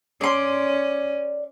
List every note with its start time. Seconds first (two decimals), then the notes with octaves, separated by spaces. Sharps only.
0.21 C#4 D5 C6